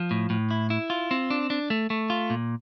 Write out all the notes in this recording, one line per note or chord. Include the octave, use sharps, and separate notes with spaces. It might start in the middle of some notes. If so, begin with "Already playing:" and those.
Already playing: F3
A2
A2
E4
E4
F4
C4
D4
D4
A3
A3
F4
A#2